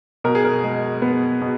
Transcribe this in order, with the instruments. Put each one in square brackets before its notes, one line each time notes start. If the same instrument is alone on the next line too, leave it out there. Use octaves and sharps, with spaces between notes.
[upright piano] B2 A#4
G#4
A#4
G#3
B3
B2